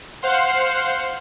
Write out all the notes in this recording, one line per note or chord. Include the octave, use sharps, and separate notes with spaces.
C5 F5 F#5 C6